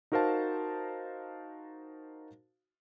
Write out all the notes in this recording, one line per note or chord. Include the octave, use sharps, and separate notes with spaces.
D#4 F#4 A#4 C5 F5 A5